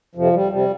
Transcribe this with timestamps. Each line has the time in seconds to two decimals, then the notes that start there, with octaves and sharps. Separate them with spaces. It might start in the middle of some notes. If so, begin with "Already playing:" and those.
0.15 F2 C3 F3
0.33 G3
0.52 C3 G3